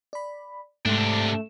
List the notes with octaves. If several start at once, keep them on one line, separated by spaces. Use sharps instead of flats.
D5 B5
G#2 C3 A3 D4